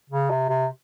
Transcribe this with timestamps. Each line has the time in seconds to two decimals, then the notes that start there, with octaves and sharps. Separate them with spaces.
0.10 C#3
0.30 C3
0.49 C3